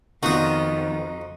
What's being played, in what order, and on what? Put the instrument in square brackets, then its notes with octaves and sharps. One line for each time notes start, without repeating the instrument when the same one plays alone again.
[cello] F2 [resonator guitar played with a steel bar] D#3 B3 F4 [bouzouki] D#4 [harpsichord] F#4 D#6